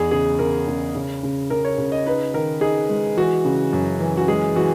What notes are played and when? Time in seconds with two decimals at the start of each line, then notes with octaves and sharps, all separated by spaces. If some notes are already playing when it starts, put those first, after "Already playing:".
Already playing: E2 D#4 G#4
0.11 C#3 G#4
0.39 C#3 A#4
0.68 C#3
0.95 C#3
1.23 C#3
1.50 C#3 A#4
1.65 C#5
1.78 C#3
1.92 D#5
2.06 D#4 B4
2.34 D#3 A#4
2.61 D#4 G#4
2.89 G#3
3.17 E3 F#4
3.45 C#3
3.73 F#2
4.00 E3
4.17 F#4
4.28 G#3 G#4
4.56 E3 F#4